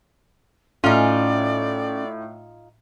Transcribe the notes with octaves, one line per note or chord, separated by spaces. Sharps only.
A2 C#4 D#4 F4 D5